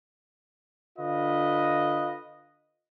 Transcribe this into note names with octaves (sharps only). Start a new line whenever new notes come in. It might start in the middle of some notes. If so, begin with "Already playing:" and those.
D3 F4 B4 D#5